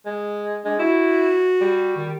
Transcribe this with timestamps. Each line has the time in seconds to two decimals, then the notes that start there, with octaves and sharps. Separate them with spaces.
0.06 G#3
0.65 G#3 D4
0.79 E4 F#4
1.61 G3
1.96 D#3